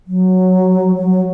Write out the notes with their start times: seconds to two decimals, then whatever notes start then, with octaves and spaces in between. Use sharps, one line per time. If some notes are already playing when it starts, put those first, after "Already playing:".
0.07 F#3
0.96 F#3